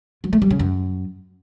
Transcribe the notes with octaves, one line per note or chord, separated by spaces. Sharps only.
F#3
A3
G3
C#3
F#2